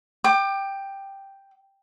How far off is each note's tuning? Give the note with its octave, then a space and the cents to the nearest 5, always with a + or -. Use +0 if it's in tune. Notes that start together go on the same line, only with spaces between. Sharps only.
G5 +0 D6 +25